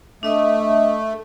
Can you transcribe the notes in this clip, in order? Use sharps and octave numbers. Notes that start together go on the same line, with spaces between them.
A3 D4 D#5 D#6